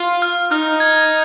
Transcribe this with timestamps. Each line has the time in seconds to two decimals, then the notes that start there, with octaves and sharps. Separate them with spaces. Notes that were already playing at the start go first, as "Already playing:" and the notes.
Already playing: F4
0.22 F6
0.51 D#4 F6
0.80 G#6